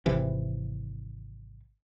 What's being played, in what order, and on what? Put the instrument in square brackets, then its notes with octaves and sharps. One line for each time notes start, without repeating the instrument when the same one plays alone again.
[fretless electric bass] G#1 C3 E3